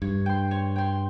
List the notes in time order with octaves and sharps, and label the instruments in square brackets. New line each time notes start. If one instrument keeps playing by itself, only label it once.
[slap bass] G2 [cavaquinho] C#5
[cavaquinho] G5 C6
C#5
G5 C6